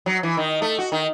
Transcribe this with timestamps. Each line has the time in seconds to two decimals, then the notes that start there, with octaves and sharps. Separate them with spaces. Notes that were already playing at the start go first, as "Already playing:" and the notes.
0.06 F#3
0.23 E3
0.37 D#3
0.62 A3
0.79 F#4
0.92 D#3